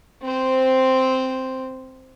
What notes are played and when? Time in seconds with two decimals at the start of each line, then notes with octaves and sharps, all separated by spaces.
0.23 C4 C5